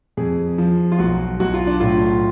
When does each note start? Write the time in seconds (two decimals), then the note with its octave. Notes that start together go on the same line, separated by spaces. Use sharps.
0.17 F2 G#4
0.58 F3
0.92 F4
0.99 B1 F#4
1.40 B1 F#4
1.54 F4
1.67 D4
1.80 A2 F4